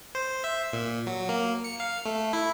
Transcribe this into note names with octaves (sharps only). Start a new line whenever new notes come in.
C5
E5
A#2
F#3
A#3
C#7
F5
A3
E4